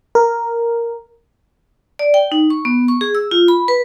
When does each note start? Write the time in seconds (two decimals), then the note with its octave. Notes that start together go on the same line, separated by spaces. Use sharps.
0.15 A#4
1.99 D5
2.14 G5
2.32 D#4
2.50 C#6
2.65 B3
2.88 C#6
3.01 G#4
3.15 E6
3.31 F4
3.48 B5
3.68 B4